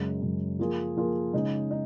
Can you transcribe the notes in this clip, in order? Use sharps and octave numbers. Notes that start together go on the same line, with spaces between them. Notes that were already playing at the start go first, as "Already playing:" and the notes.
Already playing: F#2 C#3 G#3
F#2 C#3 G#3
F3 A#3 F4 G#4
F3 A#3 F4 G#4
C#3 G#3 D#4 G#4
D#4